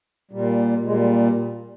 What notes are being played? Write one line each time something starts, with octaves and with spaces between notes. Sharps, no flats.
A#2 G3
A#2 G3 G#3